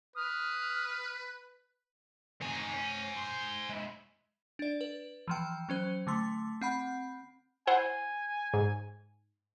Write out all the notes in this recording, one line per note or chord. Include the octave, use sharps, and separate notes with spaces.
B4 D#6 F6
D#3 C4 C5 G#5
C#4
C6
G#3 E4
D4 D5
B4
E3 F3 G5
F#3 C#4 C5
D3 A3 C6
C4 F#5 B5
E4 C5 F#5 G#5
G#2